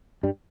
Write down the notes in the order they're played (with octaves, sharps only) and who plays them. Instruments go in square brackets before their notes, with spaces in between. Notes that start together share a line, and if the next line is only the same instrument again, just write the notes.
[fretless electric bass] G2 G3